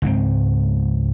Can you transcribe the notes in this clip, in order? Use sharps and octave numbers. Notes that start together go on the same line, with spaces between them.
C#2 G#2 G#3 C4